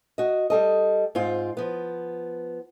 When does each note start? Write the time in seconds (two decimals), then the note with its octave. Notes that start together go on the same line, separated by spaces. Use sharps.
0.18 F#4 D#5
0.50 G3 A4 D#5
1.15 G#2 C4 F4
1.57 F3 B3